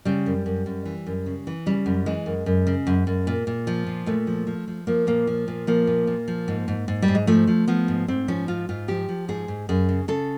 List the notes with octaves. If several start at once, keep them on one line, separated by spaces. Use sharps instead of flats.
C#3 G3
F#2
F#2
F#2
E3
F#2
C#3
E3
C#3 G3
F#2
E3 G#3
F#2
F#2
C#3
F#2
F#2
A#2
A#2
F3
A#2
A#2 A3
F3
F3
F3
F3 A#3
A#2 A#3
F3
A#2
F3 A#3
A#2
A#2
F3
G#2
G#2
G#2
G3
G#2
G#3
F3 A3
F3
F3 B3
G#2
G#2 C4
F3 C#4
G#2 F4
G#2 F4
F3 G4
F3
G#2 G#4
G#2
F#2 G#4
C#3
C#3 A4